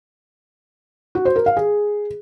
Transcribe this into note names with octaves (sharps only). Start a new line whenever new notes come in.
F#4
C5
A#4
F5
G#4